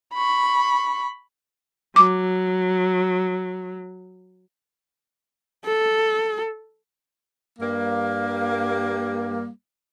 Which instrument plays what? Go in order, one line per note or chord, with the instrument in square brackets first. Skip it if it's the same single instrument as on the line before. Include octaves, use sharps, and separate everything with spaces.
[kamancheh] B5 C#6
[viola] F#3 [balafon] D6
[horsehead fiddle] A4
[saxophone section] G2 G3 A#3